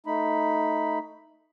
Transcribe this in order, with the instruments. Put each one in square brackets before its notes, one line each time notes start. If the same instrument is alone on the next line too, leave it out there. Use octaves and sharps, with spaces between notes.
[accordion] A3 D#4 B5